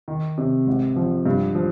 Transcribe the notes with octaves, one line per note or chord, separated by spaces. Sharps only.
D#3
C3
G#1
F3
G2
F3